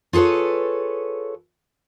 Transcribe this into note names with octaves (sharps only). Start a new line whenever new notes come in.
F4 G#4 A4 B4 C#5